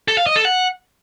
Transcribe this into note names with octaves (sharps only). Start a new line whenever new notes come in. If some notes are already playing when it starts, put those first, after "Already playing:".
A4
F5
D#5
A4
F#5